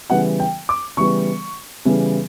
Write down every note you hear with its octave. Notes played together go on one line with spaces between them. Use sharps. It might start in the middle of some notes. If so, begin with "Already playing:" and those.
C#3 E3 G3 B3 F#5
G5
D6
C#3 E3 G3 B3 C#6
C#3 E3 G3 B3